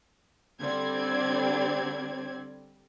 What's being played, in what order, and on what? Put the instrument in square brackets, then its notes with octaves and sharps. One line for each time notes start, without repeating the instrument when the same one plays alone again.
[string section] D3 G3 C4 C5 D5 G#6